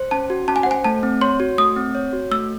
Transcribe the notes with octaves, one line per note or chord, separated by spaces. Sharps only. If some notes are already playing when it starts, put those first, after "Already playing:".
Already playing: C5
C#4 A5
F#4
C#4 A5
G#5
F#5
C5 G#5
A3 A5
C4
C#5 C6
F#4
A3 D#6
C4
C#5
F#4
A3 E6